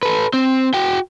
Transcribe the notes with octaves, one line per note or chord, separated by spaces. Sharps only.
A4 B4
C4
F#4 G5